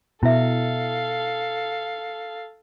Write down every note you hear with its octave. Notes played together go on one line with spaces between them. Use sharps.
B2 E4 A4 E5 F5